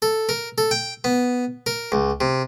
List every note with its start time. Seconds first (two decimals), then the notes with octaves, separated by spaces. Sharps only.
0.02 A4
0.29 A#4
0.58 A4
0.71 G5
1.04 B3
1.66 A#4
1.92 C#2
2.21 C3